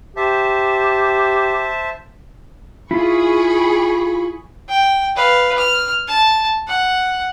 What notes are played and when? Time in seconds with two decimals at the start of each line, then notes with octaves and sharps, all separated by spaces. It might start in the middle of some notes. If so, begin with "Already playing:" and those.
0.17 G4 C5 E5 A5
2.91 E4 F4 G#4 B5 C#6
4.69 G5
5.16 B4 F5
5.58 F6
6.08 A5
6.67 F#5